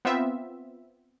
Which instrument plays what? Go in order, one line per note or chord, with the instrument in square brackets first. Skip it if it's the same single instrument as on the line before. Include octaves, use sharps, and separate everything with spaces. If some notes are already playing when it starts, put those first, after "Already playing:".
[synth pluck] B3 C4 F4 E5